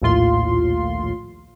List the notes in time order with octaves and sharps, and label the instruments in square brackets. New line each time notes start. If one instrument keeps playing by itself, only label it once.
[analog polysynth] A#1 D#2 A2 F4 C6